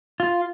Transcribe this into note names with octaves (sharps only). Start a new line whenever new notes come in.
F4